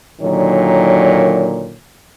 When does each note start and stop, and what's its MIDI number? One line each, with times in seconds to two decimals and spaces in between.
0.21 1.76 46
0.21 1.76 50
0.21 1.76 51
0.21 1.76 54
0.21 1.76 73